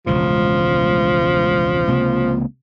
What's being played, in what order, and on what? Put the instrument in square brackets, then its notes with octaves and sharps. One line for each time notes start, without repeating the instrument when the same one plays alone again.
[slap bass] E1 C#2 A2 [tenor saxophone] F3
[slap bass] C#2 C3 A#3